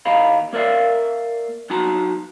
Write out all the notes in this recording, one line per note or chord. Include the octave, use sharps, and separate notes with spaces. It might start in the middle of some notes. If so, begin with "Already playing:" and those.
D#2 G4 D#5 F5 A#5 B5
A#3 A#4 D5 E5 F5
F#3 D#4 F#4 A5 A#5